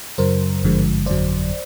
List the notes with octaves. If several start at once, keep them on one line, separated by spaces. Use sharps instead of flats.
F#2 C#3 F#3 A#4 C5
G#1 G2 D3 F3 G#3
G1 F2 D3 F#3 C5 D5